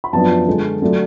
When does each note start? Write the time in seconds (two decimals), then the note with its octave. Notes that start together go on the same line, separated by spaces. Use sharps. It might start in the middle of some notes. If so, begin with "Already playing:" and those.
0.04 B5
0.13 F#2 F3 B3 D4 A5
0.47 D3 G#3 B3
0.82 D3 F#3 A3 D4